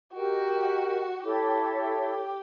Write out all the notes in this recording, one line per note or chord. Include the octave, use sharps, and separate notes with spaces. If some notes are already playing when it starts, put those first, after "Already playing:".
F#4 G4 A#4 D#5 G5
E4 G4 A4 C#5 E5
G4